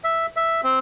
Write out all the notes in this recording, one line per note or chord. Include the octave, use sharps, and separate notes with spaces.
E5
E5
C4